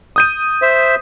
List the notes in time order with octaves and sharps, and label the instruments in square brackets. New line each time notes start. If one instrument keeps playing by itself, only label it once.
[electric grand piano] D#6 G6 D#7
[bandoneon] C5 E5